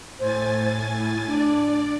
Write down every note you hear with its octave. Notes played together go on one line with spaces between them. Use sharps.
A2 C5 G#5 A6
E4
D4 D5